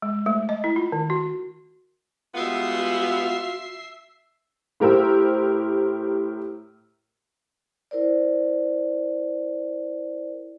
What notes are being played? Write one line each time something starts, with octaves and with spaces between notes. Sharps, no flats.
G#3
A3
D#5
E4
F4
D#3
F#4
G3 G#3 B3 F4 F#4 E5 C7
A2 G4 A#4 C5 E6
E4 A#4 C5 D5